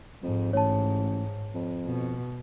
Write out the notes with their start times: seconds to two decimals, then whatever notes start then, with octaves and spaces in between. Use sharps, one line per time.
0.23 F2 G#2
0.53 A1 C#5 A5
1.55 F2
1.86 B2